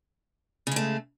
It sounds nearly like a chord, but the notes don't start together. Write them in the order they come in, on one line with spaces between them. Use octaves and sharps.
C#3 G#3 A3